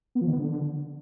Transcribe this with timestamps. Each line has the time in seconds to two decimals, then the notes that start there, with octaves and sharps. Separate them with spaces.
0.15 B3
0.21 F3
0.27 D#3
0.33 B3
0.39 D3